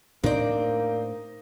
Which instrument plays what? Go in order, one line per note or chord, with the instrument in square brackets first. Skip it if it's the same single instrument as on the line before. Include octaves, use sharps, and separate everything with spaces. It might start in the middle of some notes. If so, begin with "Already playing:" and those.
[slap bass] A2 D4 [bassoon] A#3 [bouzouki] C4 D5 [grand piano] D#4